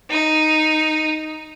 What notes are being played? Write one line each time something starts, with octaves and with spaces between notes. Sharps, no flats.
D#4